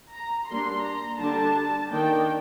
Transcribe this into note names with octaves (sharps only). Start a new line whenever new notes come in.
A#5
G3 A#3 D4 C6
A#5
D3 G3 D4 A5
D#3 A#3 D4 G5